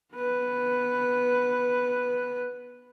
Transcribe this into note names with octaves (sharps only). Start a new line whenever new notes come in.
B3 B4